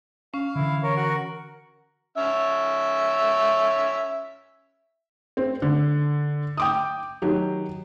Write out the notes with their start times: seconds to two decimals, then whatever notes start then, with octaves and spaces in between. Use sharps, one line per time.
0.34 C#4 F5
0.55 D3 E3 E4
0.83 A#4 C#5
0.97 F#4
2.18 C#4 E5
5.37 C4
5.62 D3
6.57 G5 D6 D#6
7.22 D#3 F#3 G4